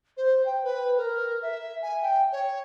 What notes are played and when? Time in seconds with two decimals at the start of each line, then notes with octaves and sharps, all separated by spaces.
0.17 C5
0.45 G5
0.63 B4
0.97 A#4
1.42 E5
1.82 G#5
2.02 G5
2.32 C#5